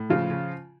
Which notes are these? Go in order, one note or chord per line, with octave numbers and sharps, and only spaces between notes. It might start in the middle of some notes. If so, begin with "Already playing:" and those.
Already playing: A2
C#3 F3 F4
C#3